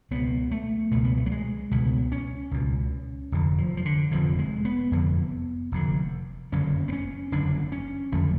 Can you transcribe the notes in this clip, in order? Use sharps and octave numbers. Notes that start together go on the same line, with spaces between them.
C#2 B2 B3
A3
C#2 B2 A3
B3
A3
F#3
G#3
C#2 B2 B3
C#4
C#2 B2
F1 F2 D3
F3
F3
D3
F1 F2 D3 F3
G#3
B3
F1 F2 D3
F1 F2 D3
F#1 F2 D3 C#4
B3
C#4
F#1 F2 D3 D4
C#4
F#1 F2 D3 A3